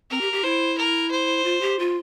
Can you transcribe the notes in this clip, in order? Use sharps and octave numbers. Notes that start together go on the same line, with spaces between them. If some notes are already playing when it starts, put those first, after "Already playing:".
C4 A#4
G4
G4
E4 C5
A#4
C5
F4
G4
F4